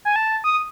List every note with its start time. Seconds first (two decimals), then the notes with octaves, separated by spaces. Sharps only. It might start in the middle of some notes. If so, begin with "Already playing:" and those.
0.05 G#5
0.16 A5
0.44 D#6